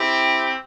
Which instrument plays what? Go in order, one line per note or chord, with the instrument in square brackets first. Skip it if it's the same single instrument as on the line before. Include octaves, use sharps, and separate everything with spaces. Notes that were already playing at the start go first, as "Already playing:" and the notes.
Already playing: [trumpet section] C4 E4 G4